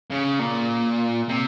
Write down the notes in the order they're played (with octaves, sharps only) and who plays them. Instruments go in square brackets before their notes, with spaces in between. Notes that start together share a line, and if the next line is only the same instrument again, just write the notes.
[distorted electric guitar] C#3
A#2
C3